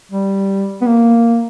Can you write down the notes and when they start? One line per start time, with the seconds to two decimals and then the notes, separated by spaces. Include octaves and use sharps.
0.11 G3
0.82 B3
0.87 A#3